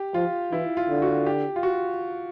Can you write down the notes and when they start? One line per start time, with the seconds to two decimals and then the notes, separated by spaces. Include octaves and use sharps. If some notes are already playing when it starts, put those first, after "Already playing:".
Already playing: G4
0.14 F3 F4
0.52 E3 E4
0.77 F4
0.90 D3
1.02 F#4
1.26 G4
1.56 F4
1.63 F#4